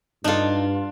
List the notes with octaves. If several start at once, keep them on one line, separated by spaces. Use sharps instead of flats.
G2 D4 D#4 F4 A4